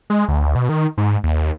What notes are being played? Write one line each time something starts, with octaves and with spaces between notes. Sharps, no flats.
G#3
D2
B2
D#3
G#2
D#2